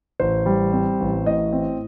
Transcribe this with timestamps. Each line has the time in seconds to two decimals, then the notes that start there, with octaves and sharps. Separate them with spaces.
0.20 A1 C5
0.46 G3
0.73 C4
1.00 A1
1.26 A2 D#5
1.52 C4